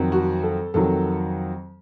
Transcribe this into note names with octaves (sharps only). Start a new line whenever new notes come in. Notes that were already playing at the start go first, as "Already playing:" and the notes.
Already playing: F2 D#3 F#3
F#4
A4
F2 D#3 F#3 A4